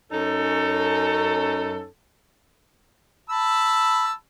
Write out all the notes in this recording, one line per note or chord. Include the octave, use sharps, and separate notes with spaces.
F#2 C#4 D#4 A4
A5 B5 E6